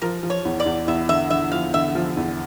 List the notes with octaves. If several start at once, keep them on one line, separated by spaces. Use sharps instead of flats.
F3 A#4
F3
C#5
E2
D5
E2
E2 E5
D3 E5
D3 E5
F3 F5
D3 E5
F3
E2